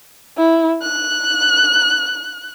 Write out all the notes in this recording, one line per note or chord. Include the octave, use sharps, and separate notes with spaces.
E4
F#6